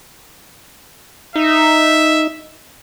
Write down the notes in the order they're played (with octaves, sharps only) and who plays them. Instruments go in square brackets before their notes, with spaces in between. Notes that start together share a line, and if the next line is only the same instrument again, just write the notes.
[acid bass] D#4 [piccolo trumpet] E5